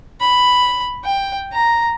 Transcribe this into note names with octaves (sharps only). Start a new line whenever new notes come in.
B5
G5
A#5